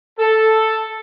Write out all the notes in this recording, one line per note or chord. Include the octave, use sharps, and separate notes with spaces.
A4